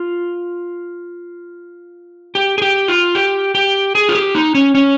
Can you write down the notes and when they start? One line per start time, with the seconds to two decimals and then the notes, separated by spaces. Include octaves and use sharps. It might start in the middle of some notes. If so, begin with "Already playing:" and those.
Already playing: F4
2.35 G4
2.58 G#4
2.62 G4
2.88 F4
3.15 G4
3.55 G4
3.95 G#4
4.09 F4
4.15 G4
4.35 D#4
4.55 C#4
4.75 C#4